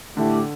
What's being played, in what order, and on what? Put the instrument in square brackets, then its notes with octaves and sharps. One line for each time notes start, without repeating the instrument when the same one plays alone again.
[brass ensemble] A2 A3 G4 [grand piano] D3